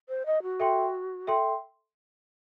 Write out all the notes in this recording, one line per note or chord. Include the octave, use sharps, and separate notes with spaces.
C5
D#5
F#4
A4 E5 G5 C6
A4 E5 G5 C6